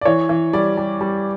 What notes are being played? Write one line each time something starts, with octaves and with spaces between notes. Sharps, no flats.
D5
E3 C#5
E3
G3 D5
G3
G3